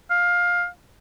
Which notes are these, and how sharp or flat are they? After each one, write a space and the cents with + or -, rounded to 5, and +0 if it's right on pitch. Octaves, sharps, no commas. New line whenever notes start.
F5 +15